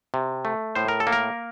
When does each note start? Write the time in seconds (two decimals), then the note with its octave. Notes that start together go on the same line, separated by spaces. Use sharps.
0.14 C3
0.45 A3
0.75 A2 C5
0.88 A#4
1.00 A4
1.07 A#3
1.12 A#4